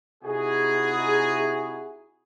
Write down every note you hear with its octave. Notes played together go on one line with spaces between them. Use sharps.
C3 D#4 E4 F#4 G#4